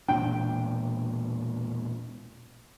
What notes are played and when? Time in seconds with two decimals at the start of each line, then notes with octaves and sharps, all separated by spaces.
0.08 E1 A#2 D4 G5